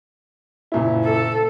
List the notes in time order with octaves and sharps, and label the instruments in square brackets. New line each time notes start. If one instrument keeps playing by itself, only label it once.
[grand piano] F#1 A#2 E4
[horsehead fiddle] A4